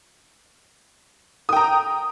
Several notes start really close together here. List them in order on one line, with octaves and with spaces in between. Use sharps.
D#6 G5 A#5